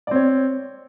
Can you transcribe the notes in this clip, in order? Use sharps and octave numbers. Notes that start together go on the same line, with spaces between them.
C4 C#5 D5